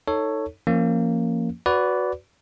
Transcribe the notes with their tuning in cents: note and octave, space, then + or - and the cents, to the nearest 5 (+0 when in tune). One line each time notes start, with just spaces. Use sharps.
D#4 +5 A4 +15 C#5 +0
F3 -25 A#3 -10 C#4 -5
F#4 +0 B4 +5 D5 -20